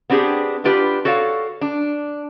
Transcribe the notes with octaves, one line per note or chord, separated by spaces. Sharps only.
B3 C4 D4 G4 G#4
B3 D4 F4 G4 B4
F#4 A4 C#5 D5 F5
D4